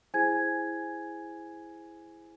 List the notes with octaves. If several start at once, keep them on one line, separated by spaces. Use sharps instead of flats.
E4 G#4 C5 G#5 G#6